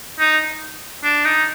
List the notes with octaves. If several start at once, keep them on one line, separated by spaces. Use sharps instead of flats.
D#4
D4
D#4